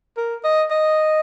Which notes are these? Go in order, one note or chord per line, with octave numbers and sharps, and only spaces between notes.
A#4
D#5
D#5